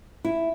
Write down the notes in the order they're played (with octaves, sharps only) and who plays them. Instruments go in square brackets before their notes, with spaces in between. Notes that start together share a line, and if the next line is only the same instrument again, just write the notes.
[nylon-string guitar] E4